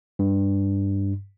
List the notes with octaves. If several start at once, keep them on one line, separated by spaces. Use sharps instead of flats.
G2